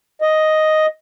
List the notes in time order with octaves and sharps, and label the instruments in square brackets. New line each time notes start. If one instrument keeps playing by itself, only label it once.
[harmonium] D#5